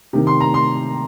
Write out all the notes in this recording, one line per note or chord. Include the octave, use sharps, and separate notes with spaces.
C3 D#3
C6
A#5
C6